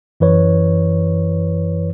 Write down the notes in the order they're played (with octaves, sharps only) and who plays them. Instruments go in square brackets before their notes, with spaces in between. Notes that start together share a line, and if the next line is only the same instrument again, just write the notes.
[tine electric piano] F#2 E3 B4 C#5